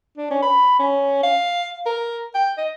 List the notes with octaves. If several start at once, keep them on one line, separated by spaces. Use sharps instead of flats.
D4
C#4
B5
C#4
F5
A#4
G5
D#5